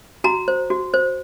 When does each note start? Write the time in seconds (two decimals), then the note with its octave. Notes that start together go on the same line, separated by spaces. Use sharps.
0.24 F#4 A#5
0.48 C5
0.70 F#4
0.94 C5